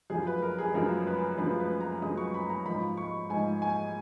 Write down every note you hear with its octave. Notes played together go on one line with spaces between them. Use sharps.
F#2 C#3 F3 G#4
B4
A#4
G#4
F#2 C#3 F3 A#4
B4
F#2 C#3 F3 B4
B4
A#5
F#2 C#3 F3 D#6
C#6
B5
A#5
G#2 F3 B5
C#6
G#2 F3 G#5
G#5